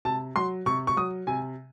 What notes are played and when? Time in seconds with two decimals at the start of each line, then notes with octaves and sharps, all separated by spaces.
0.05 C3 A5
0.36 F#3 C6
0.66 C3 C#6
0.87 C#6
0.97 F#3 D#6
1.27 C3 G#5